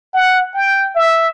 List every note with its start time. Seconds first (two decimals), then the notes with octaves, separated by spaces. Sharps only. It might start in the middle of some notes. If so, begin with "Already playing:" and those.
0.14 F#5
0.54 G5
0.96 E5